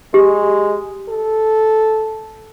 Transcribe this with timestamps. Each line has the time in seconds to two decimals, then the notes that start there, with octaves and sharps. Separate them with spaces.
0.14 G#3 G4
1.09 A4